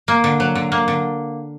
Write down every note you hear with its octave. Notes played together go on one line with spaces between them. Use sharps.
A#3
D3
F#3
D3
A#3
D3